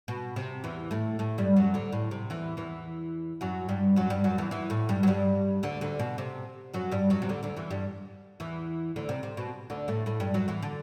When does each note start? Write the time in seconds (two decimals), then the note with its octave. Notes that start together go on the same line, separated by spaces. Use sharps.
0.08 B2
0.36 C3
0.64 E2 E3
0.91 A2 A3
1.19 A2 A3
1.38 G2 G3
1.56 F#2 F#3
1.74 D2 D3
1.92 A2
2.11 C3
2.30 E2 E3
2.57 E2 E3
3.41 F#2 F#3
3.69 G2 G3
3.96 F#2 F#3
4.10 G2 G3
4.24 F#2 F#3
4.38 E2 E3
4.51 E2 E3
4.70 A2 A3
4.89 G2 G3
5.03 F#3
5.07 G2 G3
5.63 D2 D3
5.81 D2 D3
5.99 B2
6.18 C3
6.74 F#2 F#3
6.92 G2 G3
7.10 F#2 F#3
7.22 C3
7.29 D2 D3
7.43 D2 D3
7.56 E2 E3
7.71 G2 G3
8.40 E2 E3
8.96 D2 D3
9.09 C3
9.23 C3
9.37 B2
9.70 D2 D3
9.88 A2 A3
10.06 A2 A3
10.20 G2 G3
10.34 F#2 F#3
10.48 E2 E3
10.63 D3